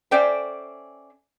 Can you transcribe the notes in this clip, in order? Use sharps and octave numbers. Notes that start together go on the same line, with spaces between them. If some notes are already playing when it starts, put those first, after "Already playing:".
C#4 A4 C5 D5 E5 G5